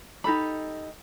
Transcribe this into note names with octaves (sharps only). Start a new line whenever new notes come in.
D#4 G4 A4 B5